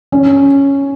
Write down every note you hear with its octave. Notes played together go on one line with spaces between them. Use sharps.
C#4